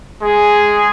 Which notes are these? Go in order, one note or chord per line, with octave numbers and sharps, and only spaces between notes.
G#3 G#4